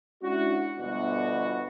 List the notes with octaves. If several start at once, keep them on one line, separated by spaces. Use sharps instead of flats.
G#3 C#4 D4 E4 F#4
G1 D2 B2 F#4